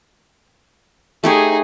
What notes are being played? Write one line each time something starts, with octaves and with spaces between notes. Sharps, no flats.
A3 D#4 G4 G#4 C#5